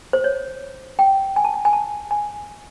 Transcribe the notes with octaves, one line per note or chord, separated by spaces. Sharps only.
C5
C#5
G5
G#5
A5
G#5
G#5
A5
G#5